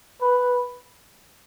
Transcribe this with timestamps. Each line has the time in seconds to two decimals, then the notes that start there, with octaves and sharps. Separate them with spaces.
0.22 B4